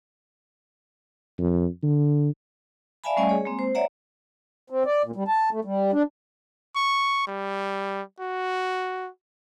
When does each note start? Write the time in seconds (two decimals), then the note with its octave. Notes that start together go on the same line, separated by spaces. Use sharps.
1.39 F2
1.83 D3
3.04 D5 E5 F5 G#5 A5 B5
3.17 G3 A3 C#4 D5 D#5 G#5
3.29 G#4 C#5
3.45 G#3 A#3 C4
3.59 C5
3.75 C#5 D5 E5 F#5 A#5
4.70 C4
4.86 D5
5.04 A#2
5.16 G3
5.28 A5
5.52 A3
5.65 G3
5.92 D4
6.76 C#6
7.27 G3
8.20 F#4